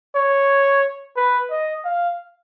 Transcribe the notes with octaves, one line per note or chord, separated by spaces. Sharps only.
C#5
B4
D#5
F5